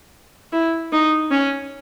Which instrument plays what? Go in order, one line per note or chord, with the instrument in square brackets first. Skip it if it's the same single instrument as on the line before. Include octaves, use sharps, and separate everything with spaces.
[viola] E4
D#4
C#4